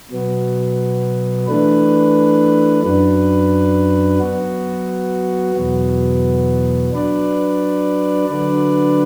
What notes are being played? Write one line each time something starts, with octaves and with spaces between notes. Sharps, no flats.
B2 F#3 B3
E3 A3 D4 B4
F#2 F#3 D4 B4
F#3 B3 F#4
E2 B2 F#3 B3
F#3 D4 B4 D5
D3 F#3 D4 B4 D5